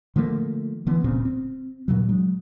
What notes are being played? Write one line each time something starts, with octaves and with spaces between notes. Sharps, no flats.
D3 F3 A3 A#3
D3 E3 B3
D1 A#2 C#3 C4
C4
G2 A#2 C#3 F#3
F#3 G#3